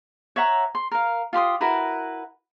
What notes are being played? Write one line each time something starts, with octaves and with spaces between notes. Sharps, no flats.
C#5 E5 F#5 A#5
C6
A#4 F5
F4 G4 C6 D#6
E4 F#4 A#4 B4